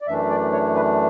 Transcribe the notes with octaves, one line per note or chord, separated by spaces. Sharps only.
D5
F#2 E3 A3 D4 E5
D5
C#5
B4